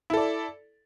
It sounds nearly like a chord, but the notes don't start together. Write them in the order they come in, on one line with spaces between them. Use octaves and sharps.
E4 A4 D5